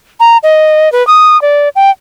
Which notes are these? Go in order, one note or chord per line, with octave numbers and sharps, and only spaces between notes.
A#5
D#5
B4
D#6
D5
G5